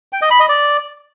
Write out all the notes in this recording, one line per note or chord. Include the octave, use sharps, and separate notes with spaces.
G5
D#5
B5
D#5
D5